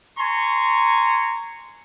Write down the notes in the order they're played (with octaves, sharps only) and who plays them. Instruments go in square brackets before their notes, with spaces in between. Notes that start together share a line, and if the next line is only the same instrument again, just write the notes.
[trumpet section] G#5 A#5 C6 C#6